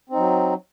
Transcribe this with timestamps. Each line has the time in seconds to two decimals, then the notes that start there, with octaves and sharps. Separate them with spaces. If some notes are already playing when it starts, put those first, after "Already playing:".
0.10 C4
0.13 D#4
0.16 F#3